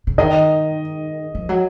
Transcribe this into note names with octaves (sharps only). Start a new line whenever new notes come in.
C#3
D#3 D#5
F3
F#3